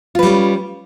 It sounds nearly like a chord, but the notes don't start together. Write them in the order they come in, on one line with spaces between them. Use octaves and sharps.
F4 B4 G3 C#4